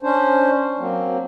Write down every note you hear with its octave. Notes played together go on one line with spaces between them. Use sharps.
C#4 D4 C5
F#3 A#3 C4